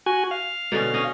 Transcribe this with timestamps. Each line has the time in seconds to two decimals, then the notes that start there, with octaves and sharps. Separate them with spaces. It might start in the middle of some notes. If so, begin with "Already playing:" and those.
0.06 F#4 G#5
0.31 F5
0.72 B2 D3 C#4
0.94 C#4 D#5